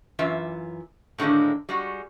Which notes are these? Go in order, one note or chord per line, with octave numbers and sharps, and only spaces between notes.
F#2 E3 F4 E5
A2 D3 D#3 G#3 A#3
G3 G#3 F#4